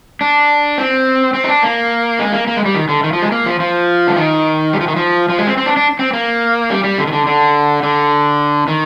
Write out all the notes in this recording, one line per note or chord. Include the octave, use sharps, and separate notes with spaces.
D4
C4
C4
D#4
D4
A#3
G#3
A#3
A#3
G#3
G3
D#3
D3
D#3
F3
G#3
A#3
F3
F3
D3
D#3
G3
F3
D#3
F3
F3
G#3
C4
C4
D4
D4
C4
A#3
G3
G3
D3
D#3
D3
D3
D3
D#3